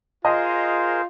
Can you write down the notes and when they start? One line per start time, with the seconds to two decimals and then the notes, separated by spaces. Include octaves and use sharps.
0.25 F4 G#4 A#4 C5 D#5